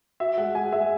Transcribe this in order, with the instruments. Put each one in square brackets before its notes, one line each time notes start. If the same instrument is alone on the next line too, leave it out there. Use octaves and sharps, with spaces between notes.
[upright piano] F#4 [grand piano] E5
[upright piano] G#3 [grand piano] F#5
[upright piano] G#3 [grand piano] G#5
[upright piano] G#3 [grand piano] E5